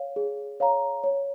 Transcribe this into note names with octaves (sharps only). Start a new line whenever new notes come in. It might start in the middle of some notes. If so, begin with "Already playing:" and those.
Already playing: C#5 F5
G#4
C#5 F5 A#5
C#5